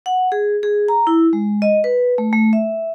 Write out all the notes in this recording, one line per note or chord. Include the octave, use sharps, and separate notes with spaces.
F#5
G#4
G#4
A#5
E4
G#3
D#5
B4
A3
A3
E5